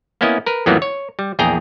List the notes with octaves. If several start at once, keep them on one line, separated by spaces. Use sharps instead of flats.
A#3 B3 C#4 E4 D#5
A#4 B4
F2 A2 E3 F#3 A#3 B3
C#5
G3
A#1 E2 G#4 G5 A#5